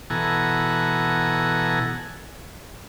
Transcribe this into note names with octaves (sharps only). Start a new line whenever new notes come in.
B2 E3 A4 F#5 G#5 A#5